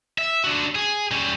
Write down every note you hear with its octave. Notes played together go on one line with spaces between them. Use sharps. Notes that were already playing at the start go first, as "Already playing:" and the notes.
E5
D4 F#4
G#4
G3 C#4